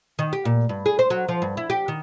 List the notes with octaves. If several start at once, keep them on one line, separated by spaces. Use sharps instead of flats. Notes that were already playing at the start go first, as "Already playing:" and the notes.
D#3
G4
A#2
G2
G#4
C5
F#3
F3
G2
E4
G4
D#3